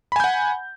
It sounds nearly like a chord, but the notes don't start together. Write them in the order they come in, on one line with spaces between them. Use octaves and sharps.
B5 G#5 G6 F#5